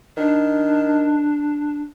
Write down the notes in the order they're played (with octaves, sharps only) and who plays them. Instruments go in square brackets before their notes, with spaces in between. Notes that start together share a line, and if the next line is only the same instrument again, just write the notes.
[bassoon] D#3 [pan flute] D4